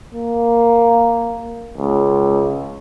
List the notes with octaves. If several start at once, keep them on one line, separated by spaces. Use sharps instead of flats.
A#3
C#2